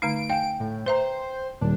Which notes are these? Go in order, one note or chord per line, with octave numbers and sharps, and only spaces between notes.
D3 A3 D#4 D7
F5 G5 G#5
A2
B4 C5 E5 A#5
D#1 D4